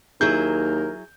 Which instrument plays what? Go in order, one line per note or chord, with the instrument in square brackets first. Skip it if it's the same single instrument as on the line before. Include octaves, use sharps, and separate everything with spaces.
[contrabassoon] D#2 [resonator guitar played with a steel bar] F#3 E4 G#4 [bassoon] A#4 [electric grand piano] G6